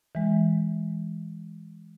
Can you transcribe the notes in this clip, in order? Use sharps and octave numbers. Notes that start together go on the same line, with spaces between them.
E3 G#3